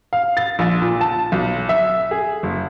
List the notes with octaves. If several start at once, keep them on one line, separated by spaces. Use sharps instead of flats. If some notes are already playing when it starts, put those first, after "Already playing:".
F5
A6
A#1
A#2
A5
B1
E5
G#4
F#1